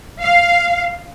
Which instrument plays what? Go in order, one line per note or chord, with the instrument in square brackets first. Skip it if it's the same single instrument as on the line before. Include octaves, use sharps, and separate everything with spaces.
[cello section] F5